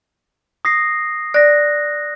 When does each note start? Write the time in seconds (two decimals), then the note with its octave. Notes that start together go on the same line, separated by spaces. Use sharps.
0.65 D#6 A#6 C7
1.34 D5 F#6 A#6